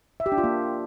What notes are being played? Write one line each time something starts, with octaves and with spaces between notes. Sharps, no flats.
E5
G4
D4
F4
A#3